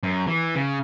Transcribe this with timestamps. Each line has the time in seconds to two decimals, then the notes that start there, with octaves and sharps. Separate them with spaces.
0.03 F#2
0.27 E3
0.55 C#3